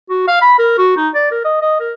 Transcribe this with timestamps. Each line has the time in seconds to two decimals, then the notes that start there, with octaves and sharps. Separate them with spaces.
0.10 F#4
0.28 F5
0.42 B5
0.58 A#4
0.78 F#4
0.97 D#4
1.15 D5
1.31 A#4
1.44 D#5
1.61 D#5
1.80 A#4